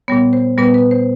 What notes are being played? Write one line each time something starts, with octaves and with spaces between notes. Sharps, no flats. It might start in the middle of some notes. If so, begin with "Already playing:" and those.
A#2 G3 B3 C#5
C5
A#2 G3 B3 B4
B4
C5